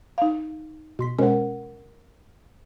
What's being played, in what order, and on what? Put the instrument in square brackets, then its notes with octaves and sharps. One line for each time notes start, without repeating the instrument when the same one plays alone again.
[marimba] D#4 F5
[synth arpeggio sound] B2 C6 B6
[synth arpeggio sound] B2 G#3 C#4 [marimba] A#4 C5 F#5